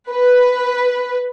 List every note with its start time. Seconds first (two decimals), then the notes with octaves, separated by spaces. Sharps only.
0.10 B4